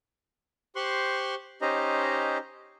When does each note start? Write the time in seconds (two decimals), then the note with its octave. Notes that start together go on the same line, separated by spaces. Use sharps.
0.76 G4 C5 C6 C#6 F#6
1.62 C#4 D#4 G4 C5 D#5 A#5